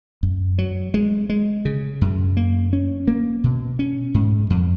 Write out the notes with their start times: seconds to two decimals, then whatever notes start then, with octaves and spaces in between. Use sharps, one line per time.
0.23 F#2
0.58 F#3
0.94 G#3
1.29 G#3
1.65 C#3
2.01 F#2
2.37 A#3
2.73 C#4
3.08 A#3
3.44 B2
3.79 C#4
4.14 G#2
4.50 F2